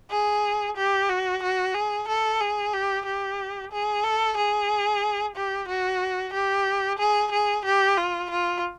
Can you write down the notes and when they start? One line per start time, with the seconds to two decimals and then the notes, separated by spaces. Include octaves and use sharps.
0.11 G#4
0.77 G4
1.09 F#4
1.43 F#4
1.74 G#4
2.08 A4
2.41 G#4
2.73 G4
3.05 G4
3.72 G#4
4.04 A4
4.37 G#4
5.35 G4
5.69 F#4
6.34 G4
6.99 G#4
7.31 G#4
7.65 G4
7.97 F4
8.30 F4